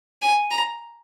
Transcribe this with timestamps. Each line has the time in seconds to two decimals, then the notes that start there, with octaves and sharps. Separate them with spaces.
0.22 G#5
0.51 A#5